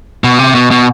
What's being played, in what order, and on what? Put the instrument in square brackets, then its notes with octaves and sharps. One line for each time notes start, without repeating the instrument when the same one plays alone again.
[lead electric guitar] B2
C3
B2
B2